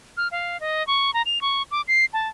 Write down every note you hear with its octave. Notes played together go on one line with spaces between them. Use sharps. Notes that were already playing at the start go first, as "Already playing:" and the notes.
F6
F5
D#5
C#6
A#5
F7
C#6
D6
C7
A5